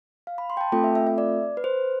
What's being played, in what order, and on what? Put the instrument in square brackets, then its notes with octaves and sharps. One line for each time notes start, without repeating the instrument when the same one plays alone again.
[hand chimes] F5
B5
C6
G5
A5
A3 C4 F4 A4 G5
E5
E5
E5
D5
B4
C5